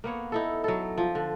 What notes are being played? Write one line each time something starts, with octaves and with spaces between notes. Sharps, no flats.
A#3 B3 C#5
D#4 E4 A4
F#3 A4
F3
D3